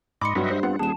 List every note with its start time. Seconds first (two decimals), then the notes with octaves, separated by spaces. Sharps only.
0.21 G#2 D#5 B5 C6 D6 C#7
0.35 G2 F#3 D#5 E5 F#5
0.51 G2 C5
0.63 B3 C4 F4 F#5
0.79 D#1 G#4 A5 E7